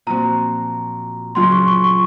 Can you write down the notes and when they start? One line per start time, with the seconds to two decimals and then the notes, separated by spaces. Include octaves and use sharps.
0.07 A#2 F3 C4 F#4 A#5
1.35 C#3 F#3 C#4 F4 C6
1.52 C#6
1.68 C#6
1.84 C#6